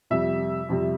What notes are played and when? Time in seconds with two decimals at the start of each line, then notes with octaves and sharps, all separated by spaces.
0.10 F2 C3 G3 E5
0.69 F2 C3 G3